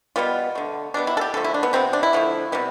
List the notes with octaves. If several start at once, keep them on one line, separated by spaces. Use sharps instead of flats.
B2 G3 B3 F4
D3 A3
B2 G3 B3 D4
E4
A4
G4
D3 F3 A3 A4
E4
D4
B3
C3 F3 B3 C4
D4
E4
D3 F3 A3
C3 G3 B3